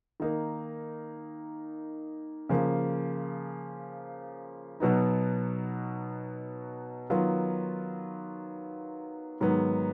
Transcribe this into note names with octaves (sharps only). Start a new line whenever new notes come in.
D#3 A#3 D#4
C#3 F3 A#3
B2 F#3 B3 D#4
D#3 F#3 B3 F4
G#2 D#3 F#3 B3